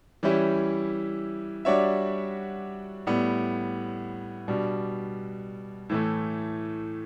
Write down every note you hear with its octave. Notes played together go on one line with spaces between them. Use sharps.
E3 G3 C#4 E4 G4
G3 D4 F#4 C#5 E5
A2 G3 B3
B2 G3 D4
A2 E3 A3